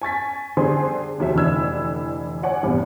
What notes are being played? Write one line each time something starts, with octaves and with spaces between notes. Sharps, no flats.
G#5 C#6 A6 B6
D3 G3 G#4 C5 G#5 C6
F1 D#2 F#3 E5
F1 D3 E3 D5 E6 G#6
C#5 D5 F#5 G#5
A#1 E2 G2 C3 E3